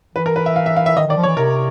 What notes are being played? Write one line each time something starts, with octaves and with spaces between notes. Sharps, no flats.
E3 B4
A#4
B4
E5
F5
E5
F5
E5
D#3 D#5
D#3 D5
F3
C#5
E3
C3 A#4